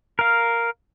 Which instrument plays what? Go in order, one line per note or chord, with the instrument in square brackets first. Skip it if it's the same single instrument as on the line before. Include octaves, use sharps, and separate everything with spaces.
[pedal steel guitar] A#4 F5